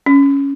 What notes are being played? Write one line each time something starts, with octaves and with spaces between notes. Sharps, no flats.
C#4